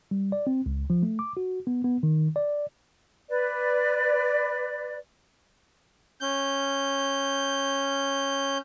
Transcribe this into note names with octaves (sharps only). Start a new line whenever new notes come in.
G3
D5
C4
C#2
F3
A3
D6
F#4
B3
B3
D#3
D5
B4 D5
C#4 G6